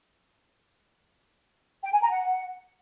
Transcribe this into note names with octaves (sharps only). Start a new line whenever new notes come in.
G5
G#5
A#5
F#5